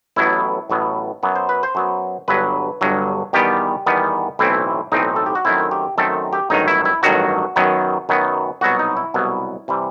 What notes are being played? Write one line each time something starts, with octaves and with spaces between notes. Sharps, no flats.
A1 A2 F#3 B3 E4
A1 A2 F#3 B3
F#2 F#3 B3
C5
B4
C5
F#2 F#3 B3
G1 G2 F#3 B4
G1 G2 F#3
E2 D#3 G3 B3 G4
E2 D#3 G3 B3
B1 A2 E3 A3 C4 E4
B1 A2 E3 A3 C4 D#4
A4
G4
F#4
F#2 D#3 A3 C4 E4
G4
F#2 D#3 A3 C4 A4
G4
A1 G2 D#3 F#3 D#4
E4
E4
A1 G2 D#3 F#3 F#4
F#2 D#3 F#3 B3
F#2 D#3 F#3 B3
C2 B2 F#3 B3 F#4
D#4
E4
C2 B2 F#3 B3
C3 E3 G3